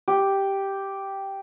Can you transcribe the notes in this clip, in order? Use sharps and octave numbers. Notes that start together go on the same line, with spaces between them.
G4